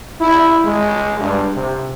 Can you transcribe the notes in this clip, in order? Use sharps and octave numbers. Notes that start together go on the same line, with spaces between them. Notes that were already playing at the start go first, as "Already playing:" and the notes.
E4
G#3
G2
C3